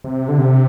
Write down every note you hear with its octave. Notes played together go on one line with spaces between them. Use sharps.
C3
D3
C3